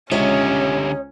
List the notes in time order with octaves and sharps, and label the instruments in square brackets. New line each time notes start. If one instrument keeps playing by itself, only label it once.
[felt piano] C#2 [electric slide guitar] D3 G4 E5 [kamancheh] C#4 [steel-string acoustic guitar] C#5 D#5